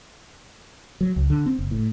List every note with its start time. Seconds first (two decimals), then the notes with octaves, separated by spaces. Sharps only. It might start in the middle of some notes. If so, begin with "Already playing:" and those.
1.01 F#3
1.16 C#2
1.30 D3
1.46 C4
1.59 F#1
1.71 A2